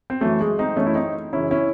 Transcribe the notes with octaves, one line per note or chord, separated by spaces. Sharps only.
C4
F#2 E3 F#3 A3
G#3
C4 D#4
F#2 E3 A3 C#4
E4
C4 D#4
F#2 C#3 E3 C#4 E4
C#4 E4